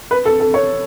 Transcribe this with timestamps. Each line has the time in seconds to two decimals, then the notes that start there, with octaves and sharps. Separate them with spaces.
0.11 B4
0.25 A4
0.40 A4
0.54 C#5